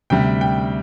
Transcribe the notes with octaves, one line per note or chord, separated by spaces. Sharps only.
D2 C3 G3 G5
G5